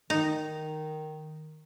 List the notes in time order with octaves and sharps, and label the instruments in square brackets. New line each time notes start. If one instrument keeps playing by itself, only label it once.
[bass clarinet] D#3 [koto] D#4